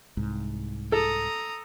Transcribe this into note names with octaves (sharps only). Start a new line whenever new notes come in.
C2 G#2
A4 A#5 D#6